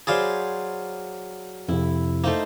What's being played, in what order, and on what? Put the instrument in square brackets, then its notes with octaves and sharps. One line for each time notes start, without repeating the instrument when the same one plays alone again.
[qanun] F#3 C5 B5 [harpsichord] G#4 D5 F5
[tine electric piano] F2 C3 [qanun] E4
[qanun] A3 D#4 C5 [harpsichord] A#3